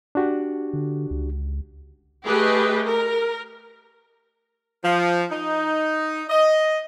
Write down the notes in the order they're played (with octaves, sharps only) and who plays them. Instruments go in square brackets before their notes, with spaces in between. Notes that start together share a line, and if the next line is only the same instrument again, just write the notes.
[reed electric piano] D4 F#4 G4
[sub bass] D3
C#2
[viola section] A3 G4 G#4 B4 D#5
A#4
[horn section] F3
D#4
D#5